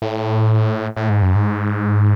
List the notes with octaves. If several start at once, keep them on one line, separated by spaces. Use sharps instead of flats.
A2
A2
G#2
F#2
G#2